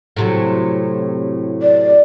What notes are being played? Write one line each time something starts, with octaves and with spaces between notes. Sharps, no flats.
A2 C3 F#3
D5